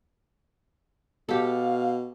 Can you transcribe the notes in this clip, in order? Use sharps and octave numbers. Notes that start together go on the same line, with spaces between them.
B2 G4 A4 F5